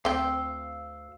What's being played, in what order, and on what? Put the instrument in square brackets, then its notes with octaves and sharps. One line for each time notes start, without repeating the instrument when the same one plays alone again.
[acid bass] D2 [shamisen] C4 G5 [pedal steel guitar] F5 C6 E6